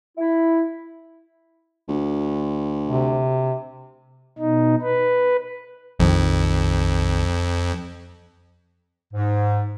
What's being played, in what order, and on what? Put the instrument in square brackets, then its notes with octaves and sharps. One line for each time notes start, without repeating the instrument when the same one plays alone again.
[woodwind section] E4
[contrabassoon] D2
[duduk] C3
[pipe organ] B2 D#4
B4
[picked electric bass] A#1 D#3 F3 [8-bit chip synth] F2
[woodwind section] G#2